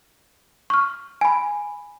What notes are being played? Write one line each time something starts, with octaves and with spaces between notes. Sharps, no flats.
C#6 F6
G#5 B5